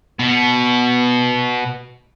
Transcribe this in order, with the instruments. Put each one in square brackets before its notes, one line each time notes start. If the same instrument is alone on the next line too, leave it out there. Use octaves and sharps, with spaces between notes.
[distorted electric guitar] B2 B3